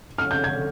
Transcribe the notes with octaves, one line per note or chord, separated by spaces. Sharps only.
F6
G6
G#6